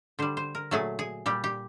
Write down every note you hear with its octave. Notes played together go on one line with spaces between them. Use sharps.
D3 G3 C5
C5
A#4
A#2 F#3 A3 G#4
G#4
A#2 G3 G4
G4